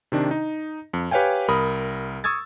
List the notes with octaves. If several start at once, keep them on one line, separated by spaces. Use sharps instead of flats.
C3 D#3 D4
D#4
F2
G4 B4 C#5 F5 G5 G#5
C2 A#4 B5 D#6
C#6 D#6 E6 G#6 A6